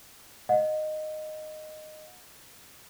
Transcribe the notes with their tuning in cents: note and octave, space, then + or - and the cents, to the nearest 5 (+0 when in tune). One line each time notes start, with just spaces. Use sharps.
D#5 -10 F#5 -30